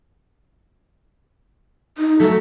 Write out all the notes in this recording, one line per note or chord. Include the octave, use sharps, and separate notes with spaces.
D#4
F#3 A3 A4 B6